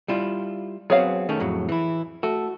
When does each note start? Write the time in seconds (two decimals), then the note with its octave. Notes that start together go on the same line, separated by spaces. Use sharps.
0.08 G3 E4 F4
0.90 F#3 B3 C4 G#4 C#5 F5
1.29 D#3 A3 C#4
1.40 F2 A2 F#3
1.69 E3 E4
2.23 A3 F#4